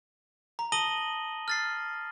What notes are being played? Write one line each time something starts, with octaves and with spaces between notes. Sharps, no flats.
A#5
A5 D#6 A#6 D#7 F#7 G7
F6 A6 C7